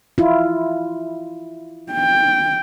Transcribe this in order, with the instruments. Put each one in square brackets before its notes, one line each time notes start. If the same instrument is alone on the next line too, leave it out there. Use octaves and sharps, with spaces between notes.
[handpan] E4 F4
[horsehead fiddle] G5